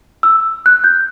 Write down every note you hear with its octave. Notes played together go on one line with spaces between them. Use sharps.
E6
F#6
G6